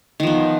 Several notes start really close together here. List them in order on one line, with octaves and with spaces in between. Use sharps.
D#3 F3 B3